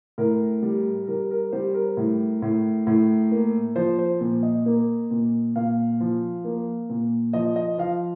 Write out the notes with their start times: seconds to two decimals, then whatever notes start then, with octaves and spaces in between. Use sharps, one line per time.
0.18 A2 A#4
0.63 G3
1.08 G3 A#4
1.31 A#4
1.52 G3 C5
1.74 A#4
1.97 A2
2.42 A2
2.87 A2
3.32 A#3
3.76 F3 C5
3.99 C5
4.21 A#2
4.43 D#5
4.66 A#3
5.11 A#2
5.56 A#2 F5
6.00 F3
6.45 A#3
6.90 A#2
7.33 F3 D#5
7.56 D#5
7.78 F3 F5